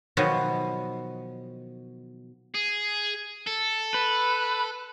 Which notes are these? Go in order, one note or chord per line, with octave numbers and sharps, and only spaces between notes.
B2 D#3 F3 F#3 B3
G#4
A4
B4